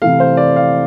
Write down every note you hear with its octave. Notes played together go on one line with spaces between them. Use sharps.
C3 E3 A3 F5
C5
D5
F5